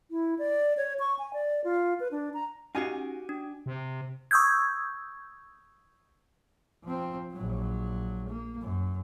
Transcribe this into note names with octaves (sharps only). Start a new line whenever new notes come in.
E4
D5
C#5
C#6
G#5
D5
F4
B4
D4
A#5
C#4 D#4 F#4 G4 D#5 F5 G#5 C7
D4
C3
C#6 D#6 E6 G6 G#6
F3 C4
A#1 F#3
A#3
F#2